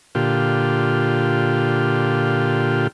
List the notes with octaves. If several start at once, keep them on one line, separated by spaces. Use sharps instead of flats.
A#2 D3 F4 G4